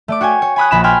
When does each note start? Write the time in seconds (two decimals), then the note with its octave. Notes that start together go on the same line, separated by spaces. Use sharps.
0.08 A3 D5 D6
0.21 F#4 C#5 G5 G#5
0.42 C#5
0.56 G#5 B5 D#6 F#6
0.71 A#1 B5 E7
0.84 G5 G#5 B5 C6 F6